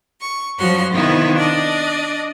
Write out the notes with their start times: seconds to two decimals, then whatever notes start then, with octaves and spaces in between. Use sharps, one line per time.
0.20 C#6
0.59 F#2 F3 G3 F#4 C#5 C6
0.92 C3 D#3 B3 E4 F4
1.36 D4 D5 D#5